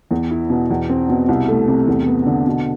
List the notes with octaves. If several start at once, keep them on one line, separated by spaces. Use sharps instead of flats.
E2
E4
B2
E2
C4
B2
C2
A3
C3
E2
B3
D3
B2